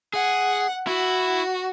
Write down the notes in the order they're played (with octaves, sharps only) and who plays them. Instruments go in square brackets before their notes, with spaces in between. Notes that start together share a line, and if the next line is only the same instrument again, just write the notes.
[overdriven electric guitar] G#4 [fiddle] F#5
[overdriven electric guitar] E4 [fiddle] F#4